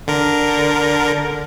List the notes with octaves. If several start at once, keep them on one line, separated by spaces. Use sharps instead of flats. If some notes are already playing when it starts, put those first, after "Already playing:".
D3 A#4